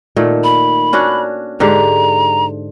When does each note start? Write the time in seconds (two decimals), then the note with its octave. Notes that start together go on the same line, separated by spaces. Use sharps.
0.16 A#2 D#3 A3
0.44 B5
0.93 C#4 D4 F#4
1.60 G#2 D3 G4 A#5